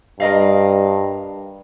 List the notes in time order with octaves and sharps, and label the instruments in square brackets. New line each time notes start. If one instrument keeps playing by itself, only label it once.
[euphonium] G2 [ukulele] A#4 D#5 F5